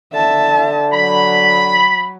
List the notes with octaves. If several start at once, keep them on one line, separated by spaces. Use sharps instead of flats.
D3 E5 A5
F#3 B5